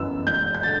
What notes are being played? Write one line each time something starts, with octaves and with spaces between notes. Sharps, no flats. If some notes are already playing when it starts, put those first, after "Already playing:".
Already playing: G1 F#2 E3 B3 E6
E1 G6
G6
D3 A6